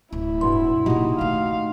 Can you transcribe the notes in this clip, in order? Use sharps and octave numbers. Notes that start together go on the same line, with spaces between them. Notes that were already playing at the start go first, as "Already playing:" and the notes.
D1 E4
G2 B2 C6
A#2 C#3 D#4 F#4 G4
D#3 A3 F5